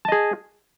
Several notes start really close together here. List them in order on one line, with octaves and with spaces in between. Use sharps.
A5 D#5 G#4